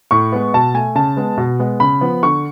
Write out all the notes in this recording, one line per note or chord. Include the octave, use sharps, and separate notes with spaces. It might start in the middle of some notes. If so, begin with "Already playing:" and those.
A2 C#6
G#3 B3
B2 A5
A3 G#5
C#3 A5
G#3 B3
B2
G#3 B3
C#3 B5
F3 B3
D3 C#6